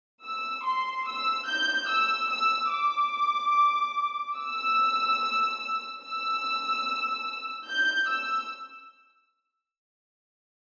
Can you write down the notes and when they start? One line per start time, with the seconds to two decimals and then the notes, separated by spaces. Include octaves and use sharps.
0.25 E6
0.65 C6
1.08 E6
1.48 G6
1.89 E6
2.31 E6
2.73 D6
4.38 E6
6.02 E6
7.68 G6
8.09 E6